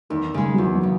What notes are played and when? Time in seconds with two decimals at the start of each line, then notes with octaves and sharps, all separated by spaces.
0.10 E2 D#3
0.34 C#3 G#3
0.54 F#3
0.58 E2 E3
0.75 F#3
0.83 C#3